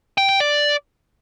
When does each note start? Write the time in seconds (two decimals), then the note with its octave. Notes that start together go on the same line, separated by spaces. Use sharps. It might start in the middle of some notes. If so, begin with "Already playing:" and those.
0.18 G5
0.29 G5
0.40 D5